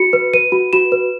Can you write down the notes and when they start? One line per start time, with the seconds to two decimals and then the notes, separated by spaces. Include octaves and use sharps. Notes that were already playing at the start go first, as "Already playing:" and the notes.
Already playing: F#4 C#7
0.13 B4
0.34 B4 D#7
0.52 F#4
0.73 F#4 E7
0.92 B4